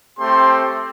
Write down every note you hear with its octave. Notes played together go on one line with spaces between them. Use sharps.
A3 C4 G4 C6